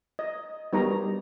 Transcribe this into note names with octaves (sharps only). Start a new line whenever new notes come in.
D#5
G3 B3 D#4 A#4 C#5 A#5